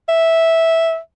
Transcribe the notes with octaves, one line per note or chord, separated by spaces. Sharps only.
E5